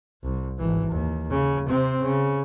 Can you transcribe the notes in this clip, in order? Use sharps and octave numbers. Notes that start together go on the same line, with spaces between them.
C2
G#1 E3
D#2
C#3
C3 C4
C#3